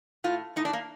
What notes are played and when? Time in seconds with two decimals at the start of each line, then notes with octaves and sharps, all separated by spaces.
0.24 A2 F4
0.56 A2 D#4
0.65 D4
0.73 A#3